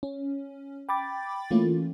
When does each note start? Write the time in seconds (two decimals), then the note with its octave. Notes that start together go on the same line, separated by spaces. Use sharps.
0.03 C#4
0.89 G5 B5 D6 A6
1.51 E3 A3 A#3 C#4 F4